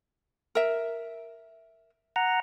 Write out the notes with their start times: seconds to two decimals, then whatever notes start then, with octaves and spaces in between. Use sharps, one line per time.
0.55 A#4 E5
2.16 F#5 A#5